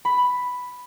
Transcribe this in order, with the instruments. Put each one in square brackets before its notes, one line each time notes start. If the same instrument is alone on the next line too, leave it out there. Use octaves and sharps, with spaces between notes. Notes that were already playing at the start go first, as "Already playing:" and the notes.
[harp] B5